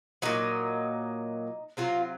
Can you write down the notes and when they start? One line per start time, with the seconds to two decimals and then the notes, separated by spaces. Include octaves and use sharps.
0.22 A#2 F#3 D#4
1.77 C3 F#3 F4